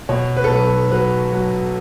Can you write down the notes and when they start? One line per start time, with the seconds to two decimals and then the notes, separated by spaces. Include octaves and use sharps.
0.09 B2 C#5
0.37 B4
0.44 A4
0.50 B1 B4
0.91 F#3 B4
1.32 F#3